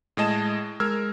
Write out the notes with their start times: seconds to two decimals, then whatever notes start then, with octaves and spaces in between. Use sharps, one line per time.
0.17 A2 G#3 D#5 A5 E7
0.80 G#3 A#4 E6 F6 G#6